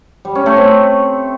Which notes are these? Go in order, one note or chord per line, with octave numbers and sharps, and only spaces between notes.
G3
C#4
A3
C4